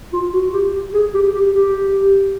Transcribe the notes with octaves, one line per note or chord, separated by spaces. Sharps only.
F4
F#4
G4
G#4
G4
G4
G4